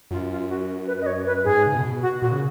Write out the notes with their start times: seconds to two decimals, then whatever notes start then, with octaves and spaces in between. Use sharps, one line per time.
0.11 F#2 F4
0.30 F4
0.49 F#4
0.87 B4
1.02 D#5
1.06 C#5
1.26 B4
1.45 G#2 G#4
1.67 C#3
1.74 B2
2.02 F#4
2.21 A#2 F#4
2.32 C#3